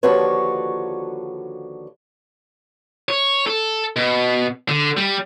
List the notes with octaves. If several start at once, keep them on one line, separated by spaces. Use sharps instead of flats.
D#2 D3 F3 F#4 B4 C#5
C#5
A4
B2
D3
G3